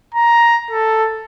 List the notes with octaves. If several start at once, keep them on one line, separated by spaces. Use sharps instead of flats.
A#5
A4